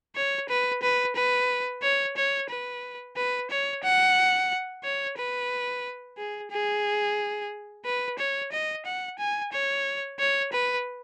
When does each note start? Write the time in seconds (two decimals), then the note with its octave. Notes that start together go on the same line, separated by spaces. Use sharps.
0.16 C#5
0.49 B4
0.82 B4
1.16 B4
1.83 C#5
2.16 C#5
2.50 B4
3.16 B4
3.50 C#5
3.83 F#5
4.84 C#5
5.17 B4
6.18 G#4
6.51 G#4
7.85 B4
8.19 C#5
8.52 D#5
8.85 F#5
9.19 G#5
9.52 C#5
10.19 C#5
10.52 B4